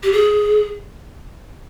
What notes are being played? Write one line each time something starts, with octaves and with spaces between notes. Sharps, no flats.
G4
G#4